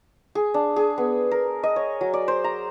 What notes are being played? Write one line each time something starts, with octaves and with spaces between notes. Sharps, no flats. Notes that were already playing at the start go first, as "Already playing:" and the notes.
G#4
D4
G#4
B3
A#4
D#5
C#5
F#3
D5
C5
A#5